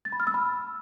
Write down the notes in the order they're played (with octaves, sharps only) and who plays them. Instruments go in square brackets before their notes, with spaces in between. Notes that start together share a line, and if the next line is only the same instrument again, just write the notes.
[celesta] A6
B5
F6
E6
B5